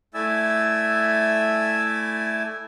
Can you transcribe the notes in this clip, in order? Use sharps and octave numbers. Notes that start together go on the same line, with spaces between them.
A3 E4 D5 E5 G#5 E6